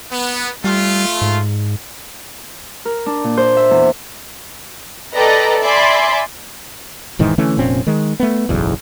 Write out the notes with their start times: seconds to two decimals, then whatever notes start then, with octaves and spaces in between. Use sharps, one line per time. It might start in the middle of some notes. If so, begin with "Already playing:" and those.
0.12 B3
0.64 G3 A3 F4
1.22 G#2
2.85 A#4
3.06 D4
3.24 A#2
3.37 C5
3.57 E5
3.71 E2
5.13 A4 B4 D5 D#5 G5 A#5
5.62 D5 E5 G#5 B5 C6
7.19 E1 G#2 D#3 E3
7.38 D3 E3 A3 C#4
7.57 F1 A#2 C4 C#4
7.87 D#3 G#3
8.20 A3 B3
8.49 F#1 B1 E2